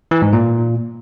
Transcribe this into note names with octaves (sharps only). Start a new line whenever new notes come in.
E3
G#2
A#2